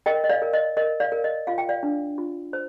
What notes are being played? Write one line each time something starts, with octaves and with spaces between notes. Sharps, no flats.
A#4 D#5 G5
D#5
D5 F5
A#4
D#5
A#4 D#5
D5 F5
A#4
D#5
F4 F5
G5
D5 F5
D4
F4
C5